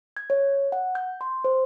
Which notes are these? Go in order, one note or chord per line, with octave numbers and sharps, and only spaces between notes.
G#6
C#5
F#5
G6
C6
C5